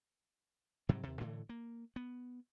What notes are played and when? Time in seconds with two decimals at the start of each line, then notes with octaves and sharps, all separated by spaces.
0.89 G#2 C3 F#3 G3
1.03 D#2 C3
1.20 A2 D3 E3 A3
1.49 A#3
1.96 B3